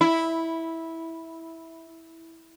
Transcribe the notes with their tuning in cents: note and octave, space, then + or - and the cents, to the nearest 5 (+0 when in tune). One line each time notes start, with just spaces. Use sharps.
E4 -10